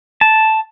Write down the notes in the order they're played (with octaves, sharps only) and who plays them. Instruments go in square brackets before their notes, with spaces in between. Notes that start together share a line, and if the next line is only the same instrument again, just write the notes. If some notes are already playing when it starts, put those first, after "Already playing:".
[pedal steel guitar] A5